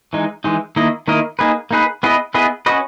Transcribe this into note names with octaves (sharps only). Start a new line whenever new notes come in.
E3 G#3 D#4
E3 G#3 D#4
D#3 A#3 E4 A#4 D#5
D#3 A#3 E4 A#4 D#5
A#3 D#4 G#4 B4
A#3 D#4 G#4 B4
B3 E4 G#4 B4 D#5
B3 E4 G#4 B4 D#5
C#4 F#4 B4 D#5